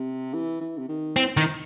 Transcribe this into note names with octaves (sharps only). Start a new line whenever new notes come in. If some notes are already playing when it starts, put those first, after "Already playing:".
Already playing: C3
E3
E3
C3
D#3
E3 C4
D#3 E3